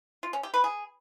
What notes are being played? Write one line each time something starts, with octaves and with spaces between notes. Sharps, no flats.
F4
C#4
G4
B4
G#4